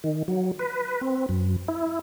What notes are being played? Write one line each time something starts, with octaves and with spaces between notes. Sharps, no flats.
D#3
F#3
B4
C4
F#2
E4